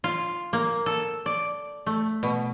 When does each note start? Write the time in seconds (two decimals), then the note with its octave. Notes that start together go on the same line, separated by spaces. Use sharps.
0.04 F4
0.53 A#3
0.86 A4
1.26 D5
1.86 A3
2.23 B2